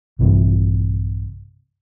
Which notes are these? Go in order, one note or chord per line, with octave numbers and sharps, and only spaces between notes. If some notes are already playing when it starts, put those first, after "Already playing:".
A#1 G2 C3 E3